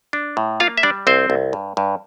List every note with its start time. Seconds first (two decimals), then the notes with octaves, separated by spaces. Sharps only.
0.13 D4
0.37 A2
0.60 A#3 F4 F5
0.78 E5
0.83 G3 D4 D5
1.07 C2 C4 C5
1.30 C2
1.53 G2
1.77 G2